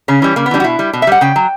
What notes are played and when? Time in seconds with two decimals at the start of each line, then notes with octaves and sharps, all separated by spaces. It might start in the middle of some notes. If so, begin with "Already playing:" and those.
0.08 C#3 C#4
0.22 E3 G3
0.36 C#3 A#3
0.46 B3
0.51 E3 G3 D4
0.60 F#4
0.64 B2 E4
0.79 G3
0.93 B2
1.02 E5
1.07 G3 F#5
1.21 C#3 G5
1.36 F#3